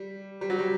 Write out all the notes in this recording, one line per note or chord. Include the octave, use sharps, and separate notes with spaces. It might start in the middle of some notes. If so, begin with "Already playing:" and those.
Already playing: G3
G3
F#3
G3